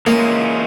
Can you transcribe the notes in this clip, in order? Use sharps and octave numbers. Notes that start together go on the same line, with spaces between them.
E3 G#3 A#3 C#4 F4